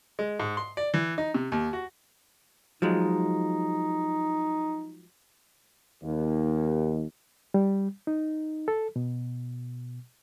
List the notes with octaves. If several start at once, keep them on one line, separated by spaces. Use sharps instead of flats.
G#3
G#2
C6
D5
E3
D#4
C3
D#2
F#4
F3 F#3 G#3 D#4
D#2
G3
D#4
A4
B2